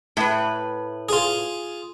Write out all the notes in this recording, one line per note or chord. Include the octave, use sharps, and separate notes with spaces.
A2 B4
F4 G#4